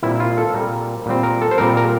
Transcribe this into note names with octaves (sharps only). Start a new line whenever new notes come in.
A#2 G3 C4 E4
E4
F4
A4
A#2 G3 C4 A#4
A#2 G3 C4
A#4
A4
C5
A#2 G3 C4 A#4
A#4